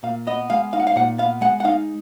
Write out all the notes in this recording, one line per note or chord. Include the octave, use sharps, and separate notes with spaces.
A#2 F5
B3 D#5
G#3 F5
D#4 F5
F#5
F5
A#2 F#5
B3 F5
G#3 F#5
F#5
D#4 F5